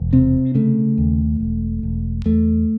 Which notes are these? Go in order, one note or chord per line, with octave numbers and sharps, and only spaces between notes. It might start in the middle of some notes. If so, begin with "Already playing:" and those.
Already playing: E1
C3 C4
C#3 A3
D#2
E1
E1
E2 A3